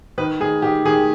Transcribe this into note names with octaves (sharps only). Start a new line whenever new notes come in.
D#3 B4
D#3 G#4
D#3 G4
D#3 G#4